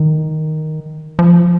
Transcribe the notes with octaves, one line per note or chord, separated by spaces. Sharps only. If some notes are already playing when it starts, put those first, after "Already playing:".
Already playing: D#3
F3